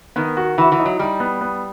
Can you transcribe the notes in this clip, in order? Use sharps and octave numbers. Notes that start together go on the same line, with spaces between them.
D#3 B3
F#4
E3 F#4
E3
D#4
F#3
G3 D#4
B3
B3